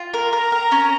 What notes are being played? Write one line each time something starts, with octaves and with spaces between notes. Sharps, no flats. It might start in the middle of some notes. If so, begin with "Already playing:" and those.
Already playing: F4
A#4
A#4 A#5
A#4
C#4